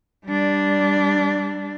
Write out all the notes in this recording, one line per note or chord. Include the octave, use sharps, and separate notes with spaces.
G3 D4